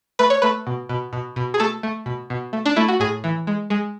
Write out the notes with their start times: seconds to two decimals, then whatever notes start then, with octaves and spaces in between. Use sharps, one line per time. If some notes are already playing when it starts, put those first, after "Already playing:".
0.19 A3 B4
0.30 C#5
0.42 A3 B4
0.67 B2
0.89 B2
1.13 B2
1.36 B2
1.54 G#4
1.60 A3 A4
1.83 A3
2.06 B2
2.30 B2
2.53 A3
2.66 D4
2.76 A3 E4
2.88 F#4
3.00 A2 G#4
3.24 E3
3.47 G#3
3.70 G#3